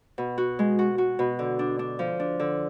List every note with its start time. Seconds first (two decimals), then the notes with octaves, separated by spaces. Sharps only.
0.18 B2
0.38 F#4
0.59 G#3
0.79 F#4
0.98 F#4
1.19 B2
1.39 D3
1.59 D4
1.79 D4
1.99 F3
2.20 D4
2.39 D3